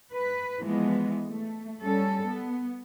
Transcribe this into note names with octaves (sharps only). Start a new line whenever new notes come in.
B4
E3 F3 G#3 B3
A3
G3 C#4 A4
B3